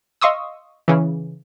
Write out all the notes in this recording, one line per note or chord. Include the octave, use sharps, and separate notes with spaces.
D#5 F5 C6 C#6 D#6 E6
C#3 E3